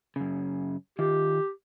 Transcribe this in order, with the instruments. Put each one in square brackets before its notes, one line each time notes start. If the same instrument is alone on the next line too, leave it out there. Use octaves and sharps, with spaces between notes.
[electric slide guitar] F#2 C#3
[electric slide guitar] D#3 F4 [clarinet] G4